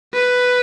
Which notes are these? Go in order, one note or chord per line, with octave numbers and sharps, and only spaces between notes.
B4